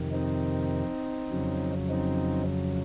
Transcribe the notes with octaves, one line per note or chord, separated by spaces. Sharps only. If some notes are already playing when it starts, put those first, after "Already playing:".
Already playing: F2 C3 D#3
C4 D#4
F2 C#3 F#3
C4 D#4